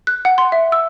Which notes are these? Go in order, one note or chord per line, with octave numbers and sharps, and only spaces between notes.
F#6
F#5
C6
E5
E6